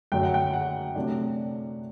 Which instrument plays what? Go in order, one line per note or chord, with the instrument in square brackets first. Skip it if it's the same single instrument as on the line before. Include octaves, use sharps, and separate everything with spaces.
[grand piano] F#2 D3 F#3 G5
F#5
G5
F#5
C3 F#3 A3 D4